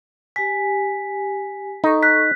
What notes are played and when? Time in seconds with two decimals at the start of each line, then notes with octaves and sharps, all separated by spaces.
0.36 G4 G#5 B6
1.84 D#4 A4 C#6
2.03 F#6 B6